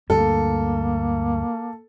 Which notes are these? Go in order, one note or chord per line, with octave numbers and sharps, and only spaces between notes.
D2 G2 A#3 A4